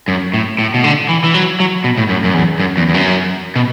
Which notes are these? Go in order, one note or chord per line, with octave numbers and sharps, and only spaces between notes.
F#2
A2
A2
B2
D3
E3
E3
F#3
F#3
B2
A2
F#2
F#2
E2
F#2
E2
E2
F#2
B2